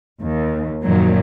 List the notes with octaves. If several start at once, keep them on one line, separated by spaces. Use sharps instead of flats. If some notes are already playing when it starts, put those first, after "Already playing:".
D#2
F#2 A#2 D#3 F3 F#3